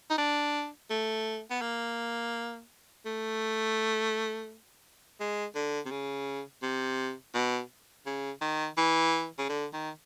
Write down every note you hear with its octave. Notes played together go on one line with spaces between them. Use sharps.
D#4
D4
A3
B3
A#3
A3
G#3
D3
C3
C#3
C3
B2
C#3
D#3
E3
C#3
D3
D#3